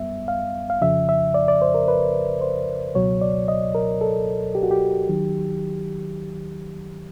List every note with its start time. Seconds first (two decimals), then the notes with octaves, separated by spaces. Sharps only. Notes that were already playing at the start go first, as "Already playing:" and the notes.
Already playing: F#2 G3 B3 E5
0.28 F5
0.70 F5
0.81 F2 C#3 F3 E5
1.09 E5
1.34 D5
1.48 D5
1.62 C5
1.74 A#4
1.88 B4
2.41 C5
2.95 C#2 B2 F#3 C#5
3.21 D5
3.48 D#5
3.75 A#4
4.01 A4
4.55 G4
4.63 F#4
4.71 G4
5.09 D#3 F#3